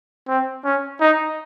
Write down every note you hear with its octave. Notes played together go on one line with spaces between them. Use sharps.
C4
C#4
D#4